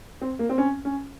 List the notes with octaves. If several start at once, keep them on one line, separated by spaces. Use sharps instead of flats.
C4
A#3
C4
C#4
C#4